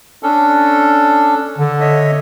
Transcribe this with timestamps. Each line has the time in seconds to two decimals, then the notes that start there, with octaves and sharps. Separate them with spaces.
0.23 C#4 D4 A4
1.59 D3
1.81 C#5 D#5 E5